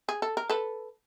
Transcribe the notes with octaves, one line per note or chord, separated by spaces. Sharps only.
G#4
A4
A#4
A4 B4